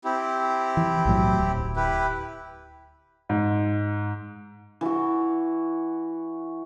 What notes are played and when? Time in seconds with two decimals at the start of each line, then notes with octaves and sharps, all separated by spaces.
0.05 C4 E4 G4
0.77 E3
1.05 B1 A2 F#3
1.38 D1
1.76 E4 G4 B4
3.29 G#2
4.81 E3 F#4